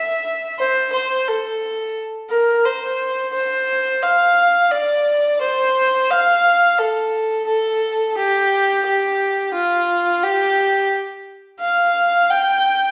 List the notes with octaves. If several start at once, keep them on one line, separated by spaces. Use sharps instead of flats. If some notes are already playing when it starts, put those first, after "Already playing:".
Already playing: E5
C5
C5
A4
A#4
C5
C5
F5
D5
C5
F5
A4
A4
G4
G4
F4
G4
F5
G5